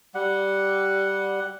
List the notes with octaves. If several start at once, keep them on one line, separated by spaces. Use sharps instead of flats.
G3 F#5